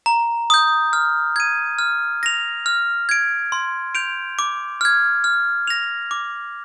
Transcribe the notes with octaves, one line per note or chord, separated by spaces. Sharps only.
A#5
D#6 G6
F6
G#6 D#7
F6
A#6 F7
F6
G#6 D7
C6
G6 D7 F7
D6
F6 G#6
F6
A#6 F7
D6